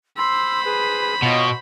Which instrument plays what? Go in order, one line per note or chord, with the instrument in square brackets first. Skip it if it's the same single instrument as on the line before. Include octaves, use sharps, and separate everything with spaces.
[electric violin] C5 B5 [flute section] C6 E6
[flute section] G#4 B4
[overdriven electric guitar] B2 [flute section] F4 C#5 D#5